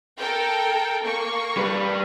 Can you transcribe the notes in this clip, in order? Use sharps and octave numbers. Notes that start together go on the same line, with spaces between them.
A4 A#4 G5
A#3 C#6
G3 B4